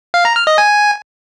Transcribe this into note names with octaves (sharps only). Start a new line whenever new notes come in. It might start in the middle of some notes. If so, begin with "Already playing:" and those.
F5
A#5
F6
D#5
G#5